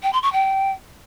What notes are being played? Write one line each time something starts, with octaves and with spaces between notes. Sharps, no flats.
G5
C6
C#6
G5